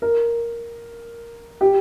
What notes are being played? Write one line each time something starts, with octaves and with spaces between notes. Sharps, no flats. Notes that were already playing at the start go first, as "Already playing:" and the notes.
A#4
G4